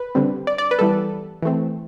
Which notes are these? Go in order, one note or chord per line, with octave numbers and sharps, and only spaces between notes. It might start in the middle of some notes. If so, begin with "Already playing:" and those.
Already playing: B4
D3 G3 C4
D5
D5
B4
E3 G3 B3 A4
E3 A3 C4